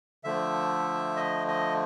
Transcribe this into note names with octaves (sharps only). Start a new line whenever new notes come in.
D3 F3 A3 E5
D#5
D#5